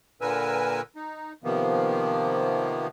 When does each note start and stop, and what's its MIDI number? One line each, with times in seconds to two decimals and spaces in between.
0.21 0.81 46
0.21 0.81 50
0.21 0.81 70
0.21 0.81 71
0.21 0.81 80
0.21 0.81 88
0.96 1.33 63
1.44 2.87 48
1.44 2.87 51
1.44 2.87 53
1.44 2.87 58
1.44 2.87 59